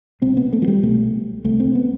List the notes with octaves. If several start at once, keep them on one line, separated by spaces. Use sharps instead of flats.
C2 B2 C4
B3
A3
F3
G3
C2 B2 A3
C2 C3 A3
C4
B3